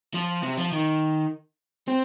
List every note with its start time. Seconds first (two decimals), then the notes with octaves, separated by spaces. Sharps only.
0.14 F3
0.43 C3
0.58 F3
0.72 D#3
1.88 C4